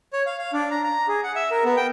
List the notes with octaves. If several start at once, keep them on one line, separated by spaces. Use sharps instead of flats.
C#5
F5
F5
D4
A#5
A#5
G#4
F#5
E5
A#4
B3
G5